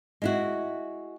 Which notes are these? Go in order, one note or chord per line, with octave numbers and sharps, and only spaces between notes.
G#3 E4 F#4